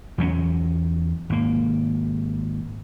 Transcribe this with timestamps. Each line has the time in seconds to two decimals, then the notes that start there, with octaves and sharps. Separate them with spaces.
0.18 E2 F#3 B3 C#4
1.30 G#1 A#3